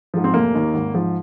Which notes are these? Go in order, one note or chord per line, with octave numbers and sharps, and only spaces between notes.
G#2 F3
C4
F1 A#3
D#2 D#3
G#1
G#2 F3